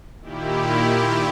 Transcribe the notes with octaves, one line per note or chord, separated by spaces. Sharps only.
A#2 D#3 E4 G4